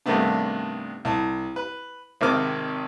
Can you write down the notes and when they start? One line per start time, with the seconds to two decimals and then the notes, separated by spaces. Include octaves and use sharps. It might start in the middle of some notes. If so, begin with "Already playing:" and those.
0.06 G2 C3 D#3 A3 B3 D4
1.05 C2 A5
1.56 B4
2.21 G#1 C3 D#3 C4 D6 F6